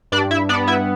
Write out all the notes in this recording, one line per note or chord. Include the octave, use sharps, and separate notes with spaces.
G2 D4 D5
E4 E5
B3 D4 D5
E4 E5